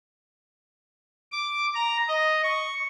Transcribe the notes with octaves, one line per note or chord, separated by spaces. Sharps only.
D6
A#5
D#5
C#6